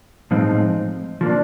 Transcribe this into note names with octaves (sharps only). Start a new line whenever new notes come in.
A2 F3 G#3 C4 D#4
F3 A#3 D4